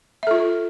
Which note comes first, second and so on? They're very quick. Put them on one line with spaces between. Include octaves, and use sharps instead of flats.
E5 A4 F4